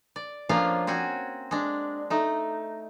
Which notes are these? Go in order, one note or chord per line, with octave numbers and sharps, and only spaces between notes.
D5
F3 A#3 C#4 D4 F4 F5
C4 C#4 F#4 G#5
G#3 D4
A3 D#4